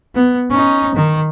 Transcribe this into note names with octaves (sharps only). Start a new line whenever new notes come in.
B3
C#4 D#4
D#3